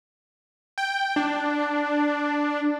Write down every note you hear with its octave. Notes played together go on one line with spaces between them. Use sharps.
G5
D4